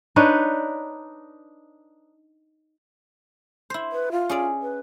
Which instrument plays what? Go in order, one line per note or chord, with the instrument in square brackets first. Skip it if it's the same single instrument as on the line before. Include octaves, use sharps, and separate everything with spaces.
[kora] D4 D#4 B4 C#5
[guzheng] E4 C5
[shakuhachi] B4
F4
[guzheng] C#4 G#4 D5
[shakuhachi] B4